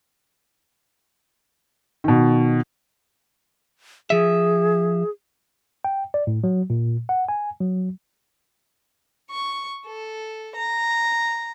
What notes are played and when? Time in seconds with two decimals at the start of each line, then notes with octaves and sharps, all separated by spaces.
2.04 B2 D#3
4.10 F3 G#4 E5
5.84 G5
6.14 D5
6.27 A2
6.44 F#3
6.70 A#2
7.09 F#5
7.29 G#5
7.60 F#3
9.30 C#6
9.86 A4
10.56 A#5